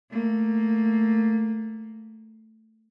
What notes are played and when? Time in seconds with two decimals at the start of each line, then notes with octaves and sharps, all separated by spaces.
0.10 A3 A#3